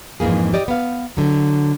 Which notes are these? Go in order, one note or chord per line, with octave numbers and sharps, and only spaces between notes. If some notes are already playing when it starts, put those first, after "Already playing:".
F2 G#2 E3 A#3 G#4
G4 D5 D#5
B3 F5
D3 F#3